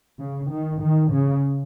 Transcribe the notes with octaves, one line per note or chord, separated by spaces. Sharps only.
C#3
D#3
D#3
C#3